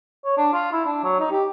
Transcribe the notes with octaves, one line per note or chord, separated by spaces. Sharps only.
C#5
D4
F4
E4
D4
F#3
D#4
G4